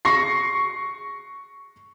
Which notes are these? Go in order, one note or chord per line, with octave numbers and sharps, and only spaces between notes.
C#6 A#6 C7